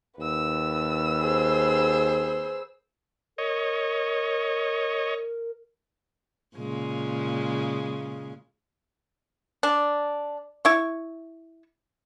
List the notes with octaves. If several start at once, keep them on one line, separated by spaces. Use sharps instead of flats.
D#2 B4 E6
G#4 C5
A#4 C#5 D#5
A#2 C#3 G#3
D4
E4 C#6